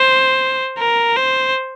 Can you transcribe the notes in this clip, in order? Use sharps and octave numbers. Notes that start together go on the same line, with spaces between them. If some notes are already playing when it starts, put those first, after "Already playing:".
Already playing: C5
A#4
C5